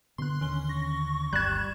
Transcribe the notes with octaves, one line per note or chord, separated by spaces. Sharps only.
B2 D3 C6 F#6
D#2 D3 D#3 C#4 G7
C#6 A#6
D1 G1 G2 G3 F#6 G#6 E7